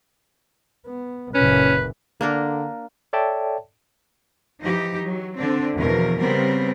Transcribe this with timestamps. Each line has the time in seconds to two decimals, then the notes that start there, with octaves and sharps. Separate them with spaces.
0.86 B3
1.35 F#1 A#2 C#4 B4
2.21 D3 A#3 D4 A#4
3.13 A4 C#5 D5 E5 G5 A5
4.61 E3 F3 D#4 G4
5.03 F#3
5.36 D3 C4 D4
5.76 E2 B2 F3 A#4
6.18 C#3 G3 B3 C4 A#4